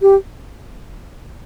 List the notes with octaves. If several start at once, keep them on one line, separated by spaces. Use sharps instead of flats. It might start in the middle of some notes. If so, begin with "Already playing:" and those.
G4